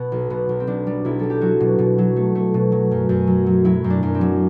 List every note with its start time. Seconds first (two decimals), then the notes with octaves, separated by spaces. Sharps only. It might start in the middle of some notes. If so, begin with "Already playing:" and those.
Already playing: B2 B3
0.12 B1
0.30 B2 B3
0.49 B1
0.60 C4
0.67 B1 D4
0.87 G3
1.05 B1 E4
1.19 G3 A4
1.30 G4
1.41 F#3 F#4
1.60 B2
1.78 B2
1.98 F#3
2.16 A3
2.35 A3
2.54 B2
2.72 F#3
2.91 F#2
3.09 F#2
3.27 F#3
3.46 F#3
3.64 F#3 E4
3.84 F#2
3.90 D4
4.03 F#2
4.14 C4
4.21 F#3